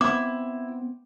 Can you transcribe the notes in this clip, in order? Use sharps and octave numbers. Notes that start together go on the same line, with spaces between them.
B3 C4 E4 D6